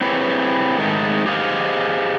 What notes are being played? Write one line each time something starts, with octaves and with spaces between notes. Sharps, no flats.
C4 E4 G4 G#4 B4 C#5
G#2 D#3 G#3 A3
G4 G#4 C5 D#5 F5